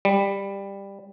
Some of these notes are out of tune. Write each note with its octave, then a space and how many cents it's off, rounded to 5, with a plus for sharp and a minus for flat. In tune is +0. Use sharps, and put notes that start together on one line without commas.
G3 +15